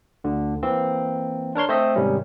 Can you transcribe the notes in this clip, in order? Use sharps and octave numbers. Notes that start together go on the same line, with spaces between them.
D2 D3
E3 A#3 C4
D4 A#4 C#5 C6
A3 C4 C5 D#5 E5
G#2 C3 D#3 G3 C#4